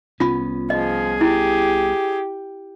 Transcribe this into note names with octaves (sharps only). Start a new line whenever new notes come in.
C2 B3 C#4 F4 B5
F3 G#4 D#5
E4 G4